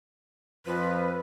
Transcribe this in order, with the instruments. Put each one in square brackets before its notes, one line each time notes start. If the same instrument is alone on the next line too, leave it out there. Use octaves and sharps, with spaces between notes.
[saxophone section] F2 F3 [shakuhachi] B4